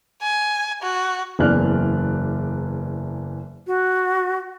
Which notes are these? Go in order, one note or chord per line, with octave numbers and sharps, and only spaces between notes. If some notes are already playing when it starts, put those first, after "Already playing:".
G#5
F#4
F#1 E2 E3 D5 F6 F#6
F#4